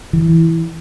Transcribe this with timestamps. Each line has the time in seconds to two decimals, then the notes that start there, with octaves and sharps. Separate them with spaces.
0.13 E3